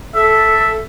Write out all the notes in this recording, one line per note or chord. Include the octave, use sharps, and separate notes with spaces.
A4 E5